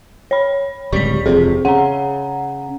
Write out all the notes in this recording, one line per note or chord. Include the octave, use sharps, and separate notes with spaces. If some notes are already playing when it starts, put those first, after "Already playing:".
C#5 B5
D1 C#2 G3 C#6 B6
E1 F2 C3 G#4
C#3 F#5 A#5